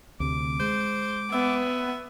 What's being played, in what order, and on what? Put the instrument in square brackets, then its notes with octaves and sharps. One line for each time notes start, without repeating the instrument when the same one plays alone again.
[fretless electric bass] D2 C3 [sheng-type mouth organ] D6
[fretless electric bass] G#3 [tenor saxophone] C5
[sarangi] B3 [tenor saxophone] E5